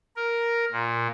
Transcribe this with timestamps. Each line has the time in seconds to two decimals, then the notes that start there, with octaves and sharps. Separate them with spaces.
0.16 A#4
0.71 A#2